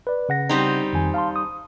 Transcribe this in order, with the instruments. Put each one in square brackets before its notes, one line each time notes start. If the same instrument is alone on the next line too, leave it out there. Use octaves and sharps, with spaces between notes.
[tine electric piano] B4 D5
C#3 F#5 A#6
[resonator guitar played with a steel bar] G3 C4 D#4
[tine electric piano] F2 D#3 G#5
F5 A5 C6
D#6